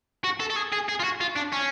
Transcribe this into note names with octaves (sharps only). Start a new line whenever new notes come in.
F#4
A4
A4
G#4
G#4
G#4
F4
F#4
F4
D4
C#4